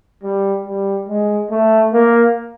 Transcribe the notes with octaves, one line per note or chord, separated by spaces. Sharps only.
G3
G3
G#3
A3
A#3